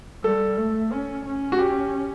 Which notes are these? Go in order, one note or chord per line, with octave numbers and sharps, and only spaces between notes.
G3 A4
A3
C#4
C#4
F#4
G4